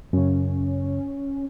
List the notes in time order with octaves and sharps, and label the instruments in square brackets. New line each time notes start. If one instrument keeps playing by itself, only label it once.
[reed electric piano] F#2 C#3 [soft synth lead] C#4